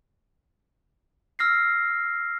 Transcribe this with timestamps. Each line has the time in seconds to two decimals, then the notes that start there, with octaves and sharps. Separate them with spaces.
1.39 E6 F6 A#6 C7